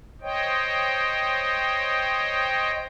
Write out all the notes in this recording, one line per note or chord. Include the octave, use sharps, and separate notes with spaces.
C5 C#5 D#5 G5